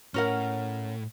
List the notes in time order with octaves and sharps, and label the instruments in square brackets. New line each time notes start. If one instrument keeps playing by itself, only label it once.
[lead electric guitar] A2 [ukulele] C#4 A#4 F#5